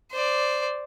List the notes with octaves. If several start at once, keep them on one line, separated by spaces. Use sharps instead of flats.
C5 D5